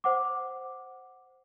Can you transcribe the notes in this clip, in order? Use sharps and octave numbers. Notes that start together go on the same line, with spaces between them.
C5 F#5 D6